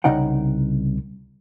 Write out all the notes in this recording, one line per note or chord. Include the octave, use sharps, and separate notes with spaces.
C2 C#3 D#4 F#5 G5